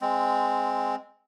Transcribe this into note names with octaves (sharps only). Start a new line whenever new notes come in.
G#3 C4